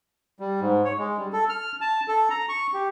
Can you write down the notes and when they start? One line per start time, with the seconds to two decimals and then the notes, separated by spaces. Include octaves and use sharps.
0.40 G3
0.61 G#2
0.85 C#5
0.98 G#3
1.18 G3
1.33 A4
1.49 F6
1.81 A5
2.08 A4
2.30 A#5
2.49 C#6
2.74 G4